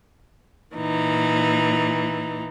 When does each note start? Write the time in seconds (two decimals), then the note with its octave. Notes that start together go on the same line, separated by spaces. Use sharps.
0.74 A#2 E3 D#4